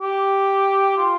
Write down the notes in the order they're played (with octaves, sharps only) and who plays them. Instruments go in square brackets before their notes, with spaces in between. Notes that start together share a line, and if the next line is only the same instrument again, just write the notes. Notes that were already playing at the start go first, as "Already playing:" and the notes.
[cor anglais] G4
F4